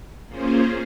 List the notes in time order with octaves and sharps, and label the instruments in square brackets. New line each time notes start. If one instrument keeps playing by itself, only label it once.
[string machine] A#3 C#4 F4 G#4 C5